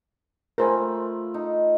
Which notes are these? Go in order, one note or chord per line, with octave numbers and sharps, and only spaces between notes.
A3 F4 A#4 C5 G#5 B5
D#4